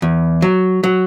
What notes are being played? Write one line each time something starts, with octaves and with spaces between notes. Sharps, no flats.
E2
F#3
F#3